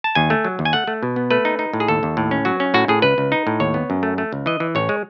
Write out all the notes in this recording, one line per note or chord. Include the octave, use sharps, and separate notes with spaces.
A5
D#2 G#5
A3
F#3
D#2
G#5
A3 F#5
A3
B2
B3
A3 B4
D#4
D#4
A2
G#4
D#2 A4
D#2
A2
C#4
F#3 F#4
C#4
A2 F#4
A2 G#4
C#2 B4
C#2
D#4
A2
D#2 C#5
B3
F#2
A3
A3
C#2
E3 D#5
E3
A1 C#5
G#3